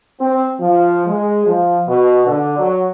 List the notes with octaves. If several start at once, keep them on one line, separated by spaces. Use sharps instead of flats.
C4
F3
G#3
F3
B2
D3
F#3